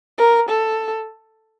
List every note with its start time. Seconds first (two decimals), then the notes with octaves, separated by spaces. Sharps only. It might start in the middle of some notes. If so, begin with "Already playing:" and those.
0.18 A#4
0.49 A4